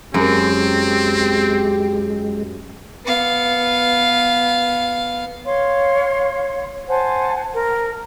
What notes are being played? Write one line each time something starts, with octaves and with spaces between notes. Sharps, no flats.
F#2 G#3 C4 G4
B3 F5
C#5 F5 C6
C5 F#5 G#5 A5
A#4